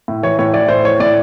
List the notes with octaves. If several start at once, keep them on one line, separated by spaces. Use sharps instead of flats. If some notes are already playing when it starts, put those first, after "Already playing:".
A2
E3 C#5
A2 C#5
E3 D5
A2 C5
E3 C#5
A2 D5